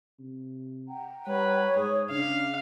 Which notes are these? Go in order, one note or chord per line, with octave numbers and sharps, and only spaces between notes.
C3
F#5 G5 A#5
G3 B4 C#5
G#2 G#4
C#3 D4 E5 F5